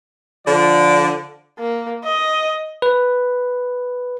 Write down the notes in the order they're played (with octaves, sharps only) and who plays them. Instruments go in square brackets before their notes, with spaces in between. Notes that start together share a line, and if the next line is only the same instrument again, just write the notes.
[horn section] D3 F3 D4 D5
[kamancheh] A#3
D#5
[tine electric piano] B4